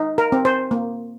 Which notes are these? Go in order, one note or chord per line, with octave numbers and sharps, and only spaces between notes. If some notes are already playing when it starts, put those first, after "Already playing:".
Already playing: D#4
A#4
C4
C5
A#3